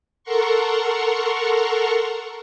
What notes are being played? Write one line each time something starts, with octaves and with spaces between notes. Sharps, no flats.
A4 A#4 F#5 A#5 C6 C#6